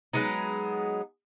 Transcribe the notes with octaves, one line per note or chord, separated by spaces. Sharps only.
F#3 G#3 B3 D#4